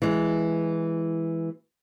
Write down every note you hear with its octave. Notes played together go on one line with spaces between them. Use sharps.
E3 G#3